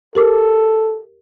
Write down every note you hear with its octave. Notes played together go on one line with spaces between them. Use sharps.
G4 A4 A#4 D6